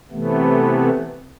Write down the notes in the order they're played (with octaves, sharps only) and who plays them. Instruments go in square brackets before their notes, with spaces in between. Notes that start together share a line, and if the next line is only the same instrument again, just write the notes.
[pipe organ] C3 E3 A3 B3